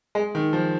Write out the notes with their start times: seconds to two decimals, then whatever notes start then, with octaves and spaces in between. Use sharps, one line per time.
0.15 G#3
0.35 D#3
0.53 F3